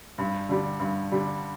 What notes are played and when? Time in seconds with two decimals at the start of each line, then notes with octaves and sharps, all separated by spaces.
0.18 G2
0.49 D3 G3
0.80 G2
1.12 D3 G3